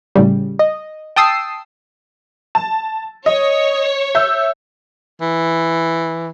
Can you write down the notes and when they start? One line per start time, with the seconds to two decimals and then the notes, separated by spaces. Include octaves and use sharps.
0.15 A2 C#3 G3
0.59 D#5
1.16 G5 A5 D#6 E6 C7
2.55 A5
3.26 C#5 D#5
4.15 E5 E6 G6
5.21 E3